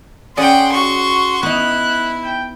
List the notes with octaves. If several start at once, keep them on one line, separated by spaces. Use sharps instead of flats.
C#4 G#4 D5 F#5 G5 C6
F#4 C#6
B3 D#4 E4 F#6
G5